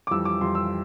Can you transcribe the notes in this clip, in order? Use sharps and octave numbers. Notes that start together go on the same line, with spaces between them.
D6
F2 E3 G3 E6
D6
F2 E3 G3 C6
E6